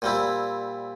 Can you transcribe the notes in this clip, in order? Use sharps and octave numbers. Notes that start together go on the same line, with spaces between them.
A#2 G3 C4 E4